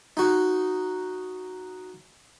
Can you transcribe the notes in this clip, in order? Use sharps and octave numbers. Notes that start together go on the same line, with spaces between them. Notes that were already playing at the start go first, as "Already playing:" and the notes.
D#4 F#4